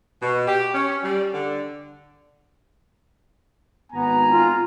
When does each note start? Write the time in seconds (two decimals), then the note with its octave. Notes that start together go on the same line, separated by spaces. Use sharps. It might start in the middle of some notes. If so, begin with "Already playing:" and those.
0.22 B2
0.47 G4
0.74 C#4
1.02 G3
1.33 D3
3.92 G#1 B3 G#5 A#5
4.30 F4